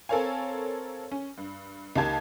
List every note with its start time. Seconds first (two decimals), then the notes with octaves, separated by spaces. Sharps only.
0.09 C4 A4 A#4 C#5 F5 G#5
1.11 C#4
1.38 G2
1.96 C#2 A#3 D#4 G4 A5 G#6